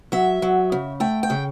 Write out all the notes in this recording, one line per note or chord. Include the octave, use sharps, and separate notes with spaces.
F#3 E5
F#3
C#3
A3 G5
G5
C#3